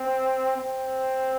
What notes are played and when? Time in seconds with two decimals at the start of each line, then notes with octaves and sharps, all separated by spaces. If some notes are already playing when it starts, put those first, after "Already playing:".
Already playing: C4
0.57 C4